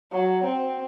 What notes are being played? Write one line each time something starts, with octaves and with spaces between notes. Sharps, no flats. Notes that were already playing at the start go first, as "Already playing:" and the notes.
F#3
C4